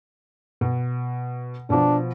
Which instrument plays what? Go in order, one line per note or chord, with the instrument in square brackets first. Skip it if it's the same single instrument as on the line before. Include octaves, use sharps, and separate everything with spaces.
[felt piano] B2
[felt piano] B2 F3 [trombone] D4